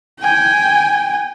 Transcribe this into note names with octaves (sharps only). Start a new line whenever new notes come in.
G5 G#5